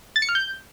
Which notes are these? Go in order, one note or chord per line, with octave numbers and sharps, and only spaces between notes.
A6
C#7
F6
G6